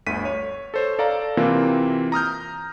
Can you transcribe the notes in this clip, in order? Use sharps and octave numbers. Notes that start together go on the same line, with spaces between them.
G1 D2 B6 D#7
C#5
A4 C5 C#5
A4 D5 F5 A#5
C3 E3 A#3 C4 F4
A#5 D#6 F6 G6